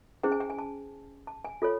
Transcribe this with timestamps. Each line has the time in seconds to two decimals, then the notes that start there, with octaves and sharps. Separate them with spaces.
0.23 C#4 E4 G#4 C5 G5
0.32 G#5
0.40 G5
0.50 G#5
0.59 A5
1.27 A5
1.45 G#5
1.62 F4 A4 C#5